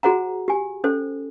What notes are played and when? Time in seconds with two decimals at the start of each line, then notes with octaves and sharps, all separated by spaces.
0.03 F#4 G#4 C5 F#5 A#5
0.48 G4 G#5
0.84 C#4 A4 C5